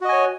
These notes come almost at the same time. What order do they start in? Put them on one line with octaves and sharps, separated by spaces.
F#4 D#5 G#5 C#5